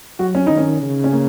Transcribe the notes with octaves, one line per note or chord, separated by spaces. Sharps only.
F#3 F#4
C#4
D#3 D#4
C#4
C#3
C#4
A#3